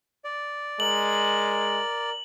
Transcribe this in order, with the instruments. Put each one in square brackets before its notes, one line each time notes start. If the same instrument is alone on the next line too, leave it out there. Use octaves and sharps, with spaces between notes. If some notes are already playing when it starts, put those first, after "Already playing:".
[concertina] D5
[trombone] G#3 [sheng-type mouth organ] A#4 [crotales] F#7